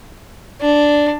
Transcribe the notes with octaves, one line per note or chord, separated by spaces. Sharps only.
D4